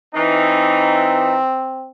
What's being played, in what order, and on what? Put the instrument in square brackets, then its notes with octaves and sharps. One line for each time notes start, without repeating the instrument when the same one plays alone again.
[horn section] E3 D#4 [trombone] C4